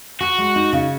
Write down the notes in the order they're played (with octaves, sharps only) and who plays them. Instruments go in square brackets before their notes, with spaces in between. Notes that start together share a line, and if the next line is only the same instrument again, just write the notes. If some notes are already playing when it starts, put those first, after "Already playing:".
[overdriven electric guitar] F#4 [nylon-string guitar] G#4
[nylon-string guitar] G#3
D#4
C#3